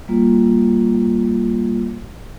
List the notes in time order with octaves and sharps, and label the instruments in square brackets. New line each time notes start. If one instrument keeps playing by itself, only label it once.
[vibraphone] G3 A#3 F4